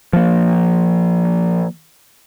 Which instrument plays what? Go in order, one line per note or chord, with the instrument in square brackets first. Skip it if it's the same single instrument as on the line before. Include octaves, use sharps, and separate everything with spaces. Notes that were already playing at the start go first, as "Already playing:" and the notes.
[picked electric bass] F3 A#3